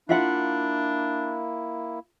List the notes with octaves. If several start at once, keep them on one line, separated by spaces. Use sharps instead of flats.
A#3 D4 E4 F4 E5 F#5